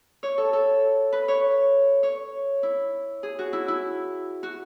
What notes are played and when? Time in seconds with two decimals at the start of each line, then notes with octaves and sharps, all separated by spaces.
0.23 C#5
0.38 A4
0.53 A4
1.12 B4
1.28 C#5
2.03 C#5
2.63 E4
3.23 G#4
3.39 F#4
3.53 E4
3.68 E4
4.43 F#4